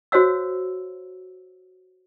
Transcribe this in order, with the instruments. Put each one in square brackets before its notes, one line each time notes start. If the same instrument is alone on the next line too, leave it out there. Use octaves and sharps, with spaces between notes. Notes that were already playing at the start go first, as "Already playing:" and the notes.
[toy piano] F#4 C5 C#5 F5 E6